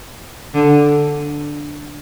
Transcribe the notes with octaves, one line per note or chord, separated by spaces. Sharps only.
D3